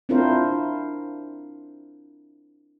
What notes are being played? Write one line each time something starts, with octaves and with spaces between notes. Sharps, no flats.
C4 D4 E4 F4 A#4 C5